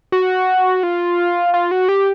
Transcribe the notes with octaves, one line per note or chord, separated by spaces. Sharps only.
F#4
F4
F4
F#4
G4